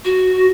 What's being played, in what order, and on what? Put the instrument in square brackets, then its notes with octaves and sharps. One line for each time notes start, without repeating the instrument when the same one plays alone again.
[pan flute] F#4